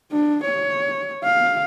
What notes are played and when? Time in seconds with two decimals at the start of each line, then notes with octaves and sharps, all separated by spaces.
0.12 D4
0.45 C#5
1.24 F5